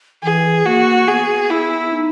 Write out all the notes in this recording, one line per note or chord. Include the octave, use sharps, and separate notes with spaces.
E3 G#4
A#3 F#4
B3 G#4
E4
D#4